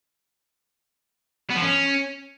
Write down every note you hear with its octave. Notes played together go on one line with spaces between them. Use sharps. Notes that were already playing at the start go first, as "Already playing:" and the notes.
B3
F3
C#4